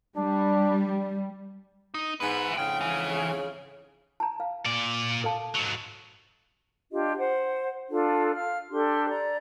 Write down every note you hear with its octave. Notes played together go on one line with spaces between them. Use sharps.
G3 D4
D#4
G#2 B3 E4 B4
F2 G#2 C#3 G5
E3
A5 A#5
F5
A#2 D5
A4 F5 A5
G#2 F#3
D4 F4 G4 D#5
C5 F#5
D4 F4 A4
F5 F6
D4 G4 A4 C6
D5 A#5